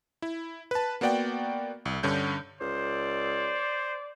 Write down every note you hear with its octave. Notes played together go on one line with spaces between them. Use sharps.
E4
B4 A5
A#3 B3 F#4 D5 F#5 G5
C2
G2 D3 C#4 G6
C#2 C5 D5